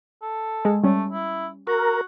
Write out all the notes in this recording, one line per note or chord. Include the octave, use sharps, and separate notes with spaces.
A4
G#3
G3 A3 C#4
E4
F#4 A#4